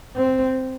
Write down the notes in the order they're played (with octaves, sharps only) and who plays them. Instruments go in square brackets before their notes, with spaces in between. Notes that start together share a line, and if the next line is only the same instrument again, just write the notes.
[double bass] C4